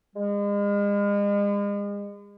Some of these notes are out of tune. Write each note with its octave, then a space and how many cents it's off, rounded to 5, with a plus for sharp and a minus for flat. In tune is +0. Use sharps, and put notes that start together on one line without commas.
G#3 -40